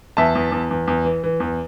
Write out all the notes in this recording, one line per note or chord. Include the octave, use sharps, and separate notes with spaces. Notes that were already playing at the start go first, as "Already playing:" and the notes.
E2 E5 A5
E2
E2
E2
E2
E3
E3
E2